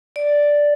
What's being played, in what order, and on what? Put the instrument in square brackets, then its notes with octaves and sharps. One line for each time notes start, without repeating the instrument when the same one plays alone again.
[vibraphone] D5